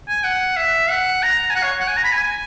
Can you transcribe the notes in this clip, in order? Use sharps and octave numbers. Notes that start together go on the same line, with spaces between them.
G#5
F#5
E5
F#5
A#5
G#5
F#5
C#5
F#5
G#5
A#5
B5
G#5